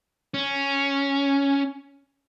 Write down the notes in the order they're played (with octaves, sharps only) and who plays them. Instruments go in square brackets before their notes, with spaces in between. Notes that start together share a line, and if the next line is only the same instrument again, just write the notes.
[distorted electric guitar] C#4